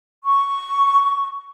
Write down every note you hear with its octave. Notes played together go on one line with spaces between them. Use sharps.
C#6